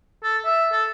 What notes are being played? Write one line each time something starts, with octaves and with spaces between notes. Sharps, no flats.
A4
E5
A4